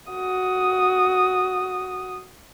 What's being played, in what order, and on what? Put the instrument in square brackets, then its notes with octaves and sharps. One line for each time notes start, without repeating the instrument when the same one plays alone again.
[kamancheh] F#4 D#6